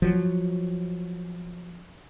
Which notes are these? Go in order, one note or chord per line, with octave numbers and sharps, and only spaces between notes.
F3 F#3